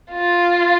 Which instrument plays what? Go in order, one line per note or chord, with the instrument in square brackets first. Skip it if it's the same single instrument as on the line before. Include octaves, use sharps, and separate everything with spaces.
[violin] F4